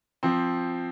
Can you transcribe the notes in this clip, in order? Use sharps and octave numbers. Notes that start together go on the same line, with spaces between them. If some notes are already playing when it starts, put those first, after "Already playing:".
F3 C4